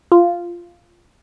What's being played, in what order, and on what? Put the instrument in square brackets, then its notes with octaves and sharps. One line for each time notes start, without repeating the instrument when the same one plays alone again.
[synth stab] F4